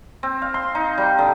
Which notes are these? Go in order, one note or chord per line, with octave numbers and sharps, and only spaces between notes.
C4
F5
C6
D#4
G3
D3